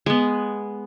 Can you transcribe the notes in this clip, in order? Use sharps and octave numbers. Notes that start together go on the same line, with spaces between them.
G#3 B3